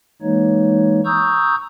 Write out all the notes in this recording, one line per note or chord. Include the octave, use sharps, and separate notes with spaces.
E3 G#3 A#3 D#4 C#5
A#5 C#6 D#6 E6 G6